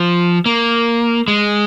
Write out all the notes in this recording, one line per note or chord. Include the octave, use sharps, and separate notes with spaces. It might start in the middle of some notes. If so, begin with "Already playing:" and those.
Already playing: F3
A#3
G#3